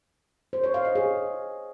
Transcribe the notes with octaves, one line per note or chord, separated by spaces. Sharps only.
C5
C#5
F5
D#5
G#4